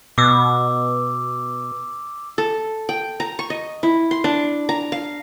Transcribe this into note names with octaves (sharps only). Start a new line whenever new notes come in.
B2 D6 E6
A4
G5
A#5
C#6
D#5
E4
C6
D4
A#5
F5